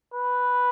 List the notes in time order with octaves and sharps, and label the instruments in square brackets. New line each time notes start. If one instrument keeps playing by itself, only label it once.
[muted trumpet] B4